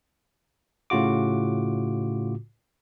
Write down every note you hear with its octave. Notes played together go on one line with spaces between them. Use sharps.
A2 C#3 F4 F#4 D6